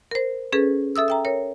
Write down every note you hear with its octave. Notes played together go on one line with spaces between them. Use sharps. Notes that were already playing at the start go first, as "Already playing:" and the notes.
A#4 C5
C#4 G#4 A4 B4
A4 E5 D#6 E6
E5 G5 A#5
A#4 C#5